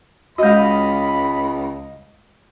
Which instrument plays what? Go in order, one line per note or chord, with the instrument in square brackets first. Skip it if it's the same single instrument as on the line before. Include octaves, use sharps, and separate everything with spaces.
[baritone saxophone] C#2 [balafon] G#3 F#4 [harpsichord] D#5 F5 [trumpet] B5